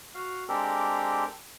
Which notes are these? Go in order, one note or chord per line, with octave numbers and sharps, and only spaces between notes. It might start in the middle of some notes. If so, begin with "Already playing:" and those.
F#4 F5
G#3 C4 D4 G4 A4 A#4